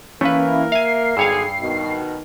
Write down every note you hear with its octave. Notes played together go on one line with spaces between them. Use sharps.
E3 A3 A#3 C#4 A#4 B4 F5
E5 F5 G#5 C7
B1 G2 D3 G#4 C#5 F5 E6
B2 D#3